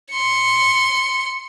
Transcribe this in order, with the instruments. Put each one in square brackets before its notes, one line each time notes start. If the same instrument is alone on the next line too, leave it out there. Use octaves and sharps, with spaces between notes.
[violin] C6 C#7